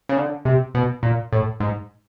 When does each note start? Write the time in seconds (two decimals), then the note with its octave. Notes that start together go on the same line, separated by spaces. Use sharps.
0.09 C#3
0.17 D3
0.45 C3
0.74 B2
1.03 A#2
1.33 A2
1.60 G#2